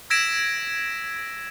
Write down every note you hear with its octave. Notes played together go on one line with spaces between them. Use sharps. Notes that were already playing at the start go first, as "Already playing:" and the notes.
E6 G#6 A#6 B6 D7 E7